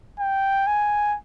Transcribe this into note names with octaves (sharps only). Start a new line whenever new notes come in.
G5
G#5